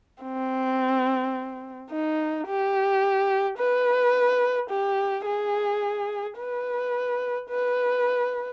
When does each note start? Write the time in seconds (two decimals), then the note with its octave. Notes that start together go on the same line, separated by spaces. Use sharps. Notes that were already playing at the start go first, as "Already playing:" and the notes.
0.23 C4
1.91 D#4
2.47 G4
3.59 B4
4.71 G4
5.26 G#4
6.38 B4
7.50 B4